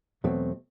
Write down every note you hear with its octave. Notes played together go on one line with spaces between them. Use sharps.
E2 B2 F#3 A3 C4